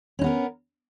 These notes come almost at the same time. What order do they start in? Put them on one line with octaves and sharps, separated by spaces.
C#4 D#4 B3 A#4